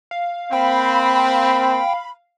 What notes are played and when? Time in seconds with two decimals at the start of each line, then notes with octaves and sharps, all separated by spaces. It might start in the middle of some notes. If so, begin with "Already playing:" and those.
0.11 F5
0.53 A#3 C4 G5 B5